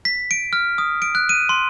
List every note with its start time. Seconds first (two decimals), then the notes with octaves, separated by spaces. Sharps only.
0.05 B6
0.31 D7
0.53 F6
0.78 D#6
1.02 D7
1.15 F#6
1.29 D#7
1.49 C6